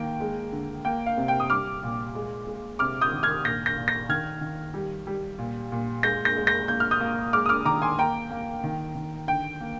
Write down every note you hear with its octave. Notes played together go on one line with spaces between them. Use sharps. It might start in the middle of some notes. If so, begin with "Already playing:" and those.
Already playing: D#3 A#3 G5
G#3
D3
A#3 G5
F5
C3
G5
D#6
G3 D6 F6
A#2
G#3
G#3
C3 D6 F6
D#6 G6
D#3
F6 G#6
A#2 G6 A#6
G6 A#6
A#2
G6 A#6
D#3 F6 G#6
D#3
G3
G3
A#2
A#2
G#3 G6 A#6
G6 A#6
G#3
G6 A#6
A#3 G6
F6
D#6 G6
A#3
G#3 D6 F6
D#6
D6 F6
D#3 A#5 D6
G#5 C6
A#3 G5 A#5
A#3
D#3
D#3
D3 G5
A#3